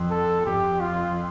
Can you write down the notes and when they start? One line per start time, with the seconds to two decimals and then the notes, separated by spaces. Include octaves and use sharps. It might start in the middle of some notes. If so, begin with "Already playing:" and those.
Already playing: F2
0.11 A4
0.46 F2 G4
0.81 F4